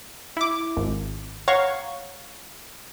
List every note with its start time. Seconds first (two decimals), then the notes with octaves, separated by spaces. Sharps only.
0.37 E4 D6
0.77 G#1
1.48 C#5 F5 F#5 A#5 C#6